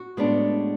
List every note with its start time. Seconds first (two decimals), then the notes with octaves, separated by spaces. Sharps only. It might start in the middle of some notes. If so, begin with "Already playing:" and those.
Already playing: F#4
0.17 A2 G#3 B3 D4